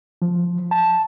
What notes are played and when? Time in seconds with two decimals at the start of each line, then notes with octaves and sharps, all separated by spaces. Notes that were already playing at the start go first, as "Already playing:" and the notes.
0.22 F3
0.71 A5